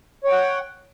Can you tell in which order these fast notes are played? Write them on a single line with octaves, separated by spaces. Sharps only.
C#5 G5 F#5